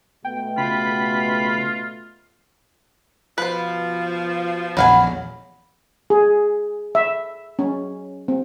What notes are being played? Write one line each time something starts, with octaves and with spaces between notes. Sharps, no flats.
B2 A3 G5
C#3 F4 B5
B2 F3 B4 C5
A#1 E2 F#3 F5 F#5 G#5 B5
G#4
E5
C#4
C4